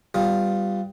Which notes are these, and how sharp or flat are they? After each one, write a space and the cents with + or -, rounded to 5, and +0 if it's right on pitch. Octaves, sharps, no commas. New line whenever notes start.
G3 +0 B3 +25 F4 +0